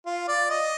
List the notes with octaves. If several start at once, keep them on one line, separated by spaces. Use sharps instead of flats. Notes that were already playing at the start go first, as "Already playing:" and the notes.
F4
D5
D#5